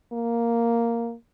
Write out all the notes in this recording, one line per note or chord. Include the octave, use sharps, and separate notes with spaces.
A#3